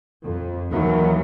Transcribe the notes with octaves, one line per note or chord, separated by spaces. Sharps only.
F2
D#2 D#3 E3 F#3